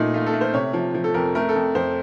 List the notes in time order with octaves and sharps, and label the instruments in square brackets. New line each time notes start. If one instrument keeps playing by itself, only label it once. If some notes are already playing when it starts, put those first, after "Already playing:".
Already playing: [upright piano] A#2 A3 D#4
A3 F4
A4
A3
C5
C3 C#5
F3
F3
A4
F2 A#4
A3 A#4
A4
F2
F2 C5